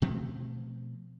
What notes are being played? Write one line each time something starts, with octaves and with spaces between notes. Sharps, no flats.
B2 F3 A3 C4